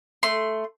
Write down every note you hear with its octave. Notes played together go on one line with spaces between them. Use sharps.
A3 C6